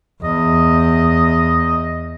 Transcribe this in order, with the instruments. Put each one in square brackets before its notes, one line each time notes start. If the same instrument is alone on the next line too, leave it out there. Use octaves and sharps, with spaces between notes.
[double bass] E2 [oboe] D#5